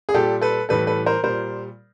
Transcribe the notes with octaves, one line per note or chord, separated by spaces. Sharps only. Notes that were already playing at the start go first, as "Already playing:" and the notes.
G#4
A#2 G3 G4 A4
A4 B4
A2 E3 G3 A4 B4
A4 B4
A#4 C5
A#2 G3 A#4 C5